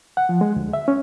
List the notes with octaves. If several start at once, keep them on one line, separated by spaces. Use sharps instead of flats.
F#5
F3
G#3
D2
E5
C#4